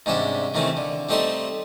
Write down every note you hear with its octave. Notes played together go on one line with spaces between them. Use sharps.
G#2 C3 G3 C#4 D4 E5
C3 D#3 E3 A3 C4 C#4
D3
G3 A3 C4 D#4 A4 C6